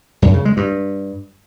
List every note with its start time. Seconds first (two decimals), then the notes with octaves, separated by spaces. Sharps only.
0.22 F#2
0.34 C#3
0.45 G#3
0.57 G2